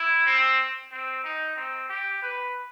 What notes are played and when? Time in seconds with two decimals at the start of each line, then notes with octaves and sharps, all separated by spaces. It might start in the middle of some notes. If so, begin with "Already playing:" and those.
Already playing: E4
0.26 C4
0.92 C4
1.24 D#4
1.56 C4
1.89 G4
2.23 B4